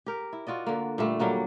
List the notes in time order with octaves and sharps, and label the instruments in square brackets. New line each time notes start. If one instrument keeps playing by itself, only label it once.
[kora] G4 A#4
E4
F4 F#4 D5 D#5
D3 A#3
A#2 G3 A3
F#3 G3 A#3 F#4